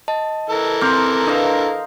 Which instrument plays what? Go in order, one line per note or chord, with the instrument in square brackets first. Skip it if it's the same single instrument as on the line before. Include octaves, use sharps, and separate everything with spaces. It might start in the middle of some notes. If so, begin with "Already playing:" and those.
[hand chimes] D#5 A5
[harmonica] E3 A4 A#4
[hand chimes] C4 F6 [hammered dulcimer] C5 A#5 D6
[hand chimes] D4 B4 [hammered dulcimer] D#5 F5